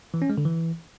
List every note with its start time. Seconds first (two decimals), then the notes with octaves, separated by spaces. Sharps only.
0.14 E3
0.22 C#4
0.30 G#3
0.38 D3
0.45 E3